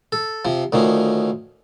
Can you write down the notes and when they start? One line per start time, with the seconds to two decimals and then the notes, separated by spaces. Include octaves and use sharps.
0.12 A4
0.45 C3 F3
0.73 D2 D#3 F3 C#4